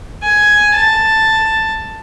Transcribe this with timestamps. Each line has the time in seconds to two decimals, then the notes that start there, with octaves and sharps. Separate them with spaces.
0.23 G#5
0.75 A5